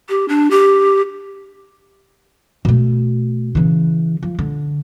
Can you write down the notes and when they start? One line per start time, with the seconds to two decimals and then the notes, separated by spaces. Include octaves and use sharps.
0.09 G4
0.29 D4
0.51 G4
2.65 B2 A3
3.55 C#3 E3
4.23 F3
4.39 D3